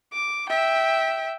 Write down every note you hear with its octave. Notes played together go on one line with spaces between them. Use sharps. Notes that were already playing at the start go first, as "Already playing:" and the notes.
D6
E5 G5